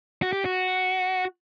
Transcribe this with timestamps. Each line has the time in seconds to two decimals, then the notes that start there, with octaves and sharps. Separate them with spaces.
0.22 F#4
0.33 G4
0.45 F#4